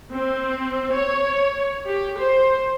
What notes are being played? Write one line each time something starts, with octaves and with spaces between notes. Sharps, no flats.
C4
C#5
G4
C5